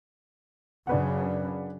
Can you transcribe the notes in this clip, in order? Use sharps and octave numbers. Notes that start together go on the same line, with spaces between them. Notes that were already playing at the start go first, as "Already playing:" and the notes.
F#2 C#3 D4 B4 F#5